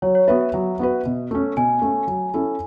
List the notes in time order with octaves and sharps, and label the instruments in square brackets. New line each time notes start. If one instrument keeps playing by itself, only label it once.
[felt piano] F#3 [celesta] C#5
[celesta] C#5
[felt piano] B3 F#4 B4 [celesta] E5
[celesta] E5
[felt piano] F#3
B3 F#4 B4
B2
A3 C#4
[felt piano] B2 [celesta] G#5
[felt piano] A3 C#4
F#3
C#4 E4 A4